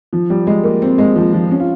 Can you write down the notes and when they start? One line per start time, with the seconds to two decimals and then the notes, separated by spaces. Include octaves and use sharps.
0.13 F3
0.30 G3
0.47 G#3
0.64 A#3
0.82 C4
0.98 G#3
1.16 F3
1.33 F3
1.51 C#4
1.60 F4